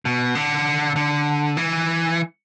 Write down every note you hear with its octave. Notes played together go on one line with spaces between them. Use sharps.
B2
D3
D3
E3